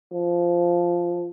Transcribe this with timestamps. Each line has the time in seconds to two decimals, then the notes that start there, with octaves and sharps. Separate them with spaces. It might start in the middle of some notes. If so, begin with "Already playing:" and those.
0.12 F3